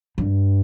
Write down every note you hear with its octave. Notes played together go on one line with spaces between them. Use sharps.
G2